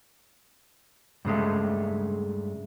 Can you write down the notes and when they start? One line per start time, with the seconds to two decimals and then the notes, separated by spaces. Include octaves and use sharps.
1.25 G2 C#3 G#3 A3